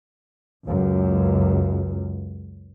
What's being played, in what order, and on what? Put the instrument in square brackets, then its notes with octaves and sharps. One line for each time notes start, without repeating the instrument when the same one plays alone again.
[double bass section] C#2 F#2